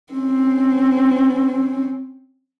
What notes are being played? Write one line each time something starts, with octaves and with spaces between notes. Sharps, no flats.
C4 C#4